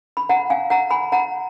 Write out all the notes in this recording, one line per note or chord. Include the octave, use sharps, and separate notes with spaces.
B5
F#5 A#5
F5 G#5
F#5 A#5
G#5 B5
F#5 A#5